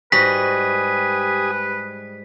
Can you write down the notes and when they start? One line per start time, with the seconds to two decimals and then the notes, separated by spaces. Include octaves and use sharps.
0.12 G#2 G3 F#4 G4 B4 G#5 D#6 B6